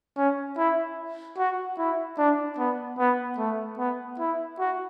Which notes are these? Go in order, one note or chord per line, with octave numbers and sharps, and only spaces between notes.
C#4
E4
F#4
E4
D4
B3
B3
A3
B3
E4
F#4